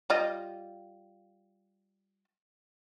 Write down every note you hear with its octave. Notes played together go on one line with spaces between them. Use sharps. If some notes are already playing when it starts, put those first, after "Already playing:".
G3 F4 D#5